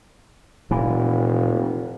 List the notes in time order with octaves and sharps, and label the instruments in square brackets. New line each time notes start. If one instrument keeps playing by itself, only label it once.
[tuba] F1 [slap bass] A#2 E3